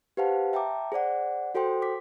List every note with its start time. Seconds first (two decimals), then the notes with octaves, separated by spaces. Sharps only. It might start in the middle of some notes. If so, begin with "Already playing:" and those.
0.17 G4 B4 C5 F5 F#5 A5
0.53 E5 G5 A5 A#5 D6
0.92 G#4 C5 D5 F#5
1.55 F#4 A4 C5 G5 C6
1.82 D6 B6